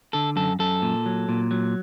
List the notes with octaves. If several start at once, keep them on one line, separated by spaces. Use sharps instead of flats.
D3 A4
F#2 A4
F#2 A4
A#2
F#3
A#2
F#3